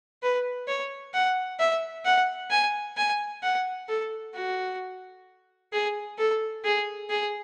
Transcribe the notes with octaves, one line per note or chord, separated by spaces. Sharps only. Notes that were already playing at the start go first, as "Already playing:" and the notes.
B4
C#5
F#5
E5
F#5
G#5
G#5
F#5
A4
F#4
G#4
A4
G#4
G#4